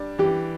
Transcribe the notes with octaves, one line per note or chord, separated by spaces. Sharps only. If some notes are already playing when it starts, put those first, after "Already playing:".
Already playing: G3 D4
E3 G4